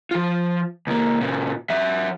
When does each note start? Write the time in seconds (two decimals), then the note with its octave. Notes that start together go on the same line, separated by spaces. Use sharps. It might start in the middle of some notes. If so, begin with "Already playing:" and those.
0.11 F3 F4
0.87 C#2 A#3
1.21 A#2 C#3
1.70 F#3 E5